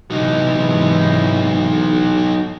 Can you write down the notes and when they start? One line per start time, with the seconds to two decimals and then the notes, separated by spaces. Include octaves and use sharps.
0.11 G#2 C3 E3 F#3 D#4